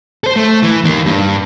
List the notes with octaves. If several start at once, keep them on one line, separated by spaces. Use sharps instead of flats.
A4 C5
A3
E3
D#3 A#3
G2